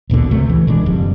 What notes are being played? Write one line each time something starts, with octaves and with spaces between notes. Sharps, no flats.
A#1 D#2 B2 D3
C#2 C3 A3
E3
E1 D#3 G#3 D4
F#1 F2 G3